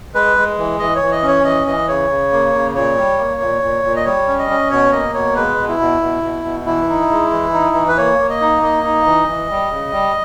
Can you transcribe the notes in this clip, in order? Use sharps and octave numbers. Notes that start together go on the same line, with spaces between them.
G#3 B4
G#3
E3
E3 D#5
C#5
E3
D#5
C#4
C#5
E3 D#5
E3 D#5
C#3 C#5
C#3
A#3
C#3
A#2 C#5
G3
A#3
A#2
A#2
A#2
D#5
G3 C#5
C#4
D#5
C#4
B2 C#5
A#3 D#5
B2 C#5
G#3 B4
B2
E4
B2
B2
B2
B2
E3 E4
D#4
G#3
E3
D#4
E3
B4
A#3 C#5
A#3
D#5
D#4
A#3 D#5
D#4
E3
E3
G3
C#3
G3